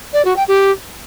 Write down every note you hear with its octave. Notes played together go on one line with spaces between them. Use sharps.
D5
F#4
G5
G4